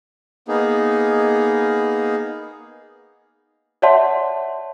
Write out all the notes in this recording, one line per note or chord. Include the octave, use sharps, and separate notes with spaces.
A#3 B3 D#4 G#4
C#5 D5 E5 F#5 A5 C6